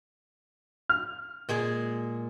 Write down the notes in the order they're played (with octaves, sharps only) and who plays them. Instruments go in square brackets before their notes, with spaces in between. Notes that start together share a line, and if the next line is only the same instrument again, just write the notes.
[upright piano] F6
[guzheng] A#2 G#3 G#4